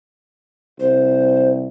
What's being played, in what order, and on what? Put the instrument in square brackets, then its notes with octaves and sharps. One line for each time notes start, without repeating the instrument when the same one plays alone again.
[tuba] C2 [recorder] C5